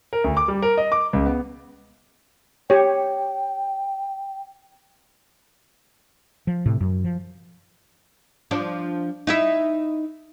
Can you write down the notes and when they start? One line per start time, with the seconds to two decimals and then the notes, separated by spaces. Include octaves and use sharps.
0.13 A#4
0.24 D2
0.37 D6
0.48 G3
0.62 A#4
0.77 D#5
0.92 D6
1.13 C#2
1.26 B3
2.70 G4 C#5 G5
6.47 F3
6.66 A2 C3
6.81 F#2
7.04 F3
8.51 F3 D4
9.27 D#4 E4 E5